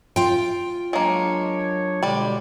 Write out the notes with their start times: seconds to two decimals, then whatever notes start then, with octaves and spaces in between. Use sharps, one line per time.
0.16 F4 G5
0.93 F#3 G#3 A#3 D4 C#5
2.03 B2 D3 G3 G#3 D5